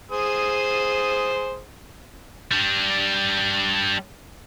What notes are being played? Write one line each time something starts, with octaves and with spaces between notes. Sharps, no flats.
G#4 C5 D#6
G3 D4